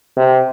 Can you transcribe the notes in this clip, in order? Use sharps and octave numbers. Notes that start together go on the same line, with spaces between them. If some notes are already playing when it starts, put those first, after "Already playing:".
C3